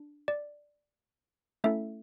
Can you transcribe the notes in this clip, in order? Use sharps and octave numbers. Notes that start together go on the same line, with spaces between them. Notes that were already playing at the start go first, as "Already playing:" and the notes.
Already playing: D4
D5
A3 C#4 E4 A4 E5